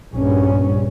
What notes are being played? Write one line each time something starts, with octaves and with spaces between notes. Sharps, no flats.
A#1 G2 C#4